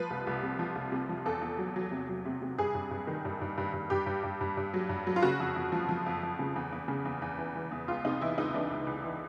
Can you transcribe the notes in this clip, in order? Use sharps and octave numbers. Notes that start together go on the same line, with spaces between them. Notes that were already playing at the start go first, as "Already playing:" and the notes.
Already playing: F3 B4
C2
C2
C3
F3
C2
C3
F3
E2 A4
E2
F#3
F#3
C3
F#3
C3
C3
G2 G#4
G2
G2
D#3
G2
G2
G2
G2
G2 G4
G2
G2
G2
G2
F#3
G2
F#3
F4
C#3 F#4
F2
F2
F3
F3
F2
F2
C#3
E2
E2
C#3
E2
E2
E3
E3
E2
C#2 F4
C3 D#4
E3 E4
C#2 D#4
E3 D4
C#2
C#2
E3